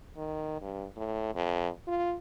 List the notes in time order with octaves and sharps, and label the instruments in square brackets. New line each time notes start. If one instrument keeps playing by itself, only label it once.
[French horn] D#3
G2
A2
F2
F4